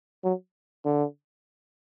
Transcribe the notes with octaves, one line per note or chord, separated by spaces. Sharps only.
F#3
D3